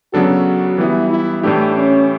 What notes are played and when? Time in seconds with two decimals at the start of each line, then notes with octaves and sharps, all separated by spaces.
0.13 C#3 F#3 B3 D4 F#4 A4
0.78 E3 G3 B3 E4
1.10 E4
1.43 A2 E3 A3 D4 E4 G4
1.75 C#4